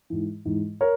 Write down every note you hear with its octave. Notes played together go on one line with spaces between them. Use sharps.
G#2 E3
G#2 E3
A#4 C#5